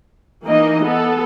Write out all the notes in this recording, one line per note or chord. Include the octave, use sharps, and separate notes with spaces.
E3 A#3 D#4 D#5
B3 A4